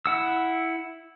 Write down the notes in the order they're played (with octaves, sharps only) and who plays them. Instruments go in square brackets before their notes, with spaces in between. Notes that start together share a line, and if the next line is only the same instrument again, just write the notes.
[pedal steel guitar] E4 F#5 E6